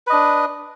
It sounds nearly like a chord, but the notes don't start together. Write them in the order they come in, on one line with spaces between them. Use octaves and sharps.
B4 D#5 D4